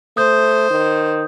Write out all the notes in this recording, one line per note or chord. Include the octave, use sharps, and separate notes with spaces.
A3 C5 D#6 G6
D#3